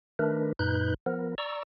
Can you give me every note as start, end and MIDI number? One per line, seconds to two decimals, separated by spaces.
0.19 0.53 51
0.19 0.53 57
0.19 0.53 62
0.19 0.53 70
0.19 0.53 71
0.59 0.94 42
0.59 0.94 46
0.59 0.94 63
0.59 0.94 71
0.59 0.94 90
0.59 0.94 91
1.06 1.35 53
1.06 1.35 59
1.06 1.35 70
1.38 1.63 74
1.38 1.63 82
1.38 1.63 85
1.38 1.63 88